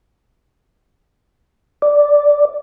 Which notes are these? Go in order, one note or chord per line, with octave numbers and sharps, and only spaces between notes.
D5